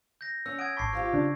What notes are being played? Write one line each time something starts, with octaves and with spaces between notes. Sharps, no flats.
G6 A#6
C#4 E6
F#5 D#6 G#6 D7
G#1 A5 B5 C#6 D6 C7
F3 F4 G4
C#3 D4